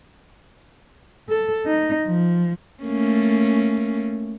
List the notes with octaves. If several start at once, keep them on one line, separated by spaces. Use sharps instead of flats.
A4
D#4
F3
A3 A#3 C#4